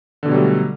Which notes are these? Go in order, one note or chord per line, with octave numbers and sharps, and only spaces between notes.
B2 D3 F#3 G3 A3